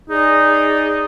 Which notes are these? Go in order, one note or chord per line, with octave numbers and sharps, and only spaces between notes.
D#4 G#4 D5